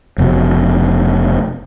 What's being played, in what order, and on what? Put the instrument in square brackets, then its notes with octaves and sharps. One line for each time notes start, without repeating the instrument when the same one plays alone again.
[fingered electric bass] F1 B2